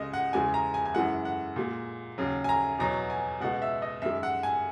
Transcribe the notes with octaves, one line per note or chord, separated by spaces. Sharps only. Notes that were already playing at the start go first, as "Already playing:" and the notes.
Already playing: C#2 C#3 G#3 D#5
F#5
E2 C#3 G#3 G#5
A#5
G#5
G#5
F#2 E3 G#3 F#5
F#5
A#2 G#3
D#2 C#3 F#3
G#5
A#5
E2 B2 F#3 A#5
G#5
C#2 B2 G#3 F#5
E5
D#5
F#2 D#3 G#3 E5
F#5
G#5